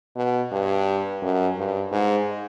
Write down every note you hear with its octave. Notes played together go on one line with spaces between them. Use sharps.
B2
G2
F#2
G2
G#2